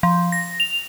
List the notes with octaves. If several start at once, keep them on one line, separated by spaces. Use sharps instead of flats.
F3
A#6
F7